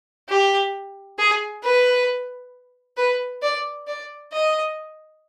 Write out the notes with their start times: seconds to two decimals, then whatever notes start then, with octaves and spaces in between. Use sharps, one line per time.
0.29 G4
1.18 G#4
1.63 B4
2.97 B4
3.42 D5
3.87 D5
4.33 D#5